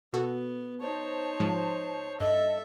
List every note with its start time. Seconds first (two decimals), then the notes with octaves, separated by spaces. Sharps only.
0.13 B2 B3 F#4 A4
0.80 D#4 C5 C#5 A5
1.40 G#2 F3 G#3
2.20 G2 A4 D#5 E5